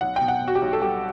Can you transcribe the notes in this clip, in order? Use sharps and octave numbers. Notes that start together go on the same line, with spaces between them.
B1 F#5
G5
B2
F#5
B2
F#4
G4
B1
A4
G3 G4